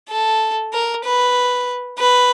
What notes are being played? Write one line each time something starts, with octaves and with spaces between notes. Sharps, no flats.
A4
A#4
B4
B4